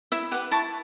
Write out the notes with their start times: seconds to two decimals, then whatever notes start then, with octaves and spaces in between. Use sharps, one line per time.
0.12 E4 E5
0.31 G4 B4 F#5
0.51 E4 A5 C#6